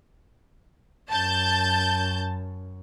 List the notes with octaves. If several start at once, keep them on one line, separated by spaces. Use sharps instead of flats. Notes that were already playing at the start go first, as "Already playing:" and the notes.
F#2 A5 G6